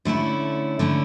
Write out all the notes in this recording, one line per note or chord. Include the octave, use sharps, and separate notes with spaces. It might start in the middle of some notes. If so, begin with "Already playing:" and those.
D3 A3 C#4 E4
D3 A3 C#4 E4